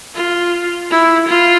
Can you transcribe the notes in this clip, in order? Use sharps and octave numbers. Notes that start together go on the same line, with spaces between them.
F4
E4
F4